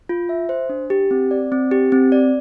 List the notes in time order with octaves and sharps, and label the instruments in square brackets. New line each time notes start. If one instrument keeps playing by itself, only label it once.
[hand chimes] F4
E5
C5
D4
G4
C4
D5
C4
G4
C4
D5